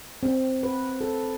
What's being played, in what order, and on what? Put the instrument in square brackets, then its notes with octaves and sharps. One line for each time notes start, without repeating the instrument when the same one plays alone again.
[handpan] C4
B4
A4